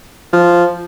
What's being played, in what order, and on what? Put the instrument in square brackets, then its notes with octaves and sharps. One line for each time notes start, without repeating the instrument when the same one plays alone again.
[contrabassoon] F3